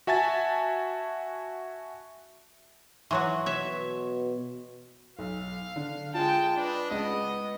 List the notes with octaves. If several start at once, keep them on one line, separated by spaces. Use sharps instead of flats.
F#4 E5 G#5 A5 A6
E3 F#3 F#4 C6 C#6
B2 C#5 E5
B1 F5
D3
G#3 F4 G5 A5
D4 B4 D#5
C#2 B3 D#5